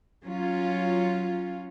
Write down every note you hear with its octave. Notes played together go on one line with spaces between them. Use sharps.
F#3 C#4 F4